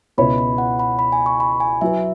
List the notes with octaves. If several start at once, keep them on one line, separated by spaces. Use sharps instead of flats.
C#2 B2 B3 E4 C#5 B5
B5
F#5
B5
B5
G#5
C#6
B5
G#5
F#3 E4 B4 E5